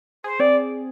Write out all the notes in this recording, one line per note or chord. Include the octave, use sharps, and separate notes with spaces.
G#4 C5
C4 D5